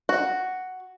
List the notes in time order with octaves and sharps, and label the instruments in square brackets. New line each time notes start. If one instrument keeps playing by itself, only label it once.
[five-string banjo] F#4